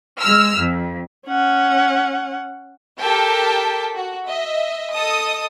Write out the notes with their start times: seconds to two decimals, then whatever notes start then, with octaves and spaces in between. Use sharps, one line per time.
0.21 G#3 E6 F6
0.57 F2
1.27 C#4 F#5
3.00 G4 A4 A#4 G5 A5 B6
3.94 F#4
4.27 D#5 E5
4.94 A4 D#5 D#6